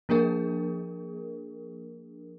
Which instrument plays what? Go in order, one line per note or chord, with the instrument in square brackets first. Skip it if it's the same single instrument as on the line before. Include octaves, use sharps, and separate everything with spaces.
[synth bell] F3 A#3 D4 G#4 A#4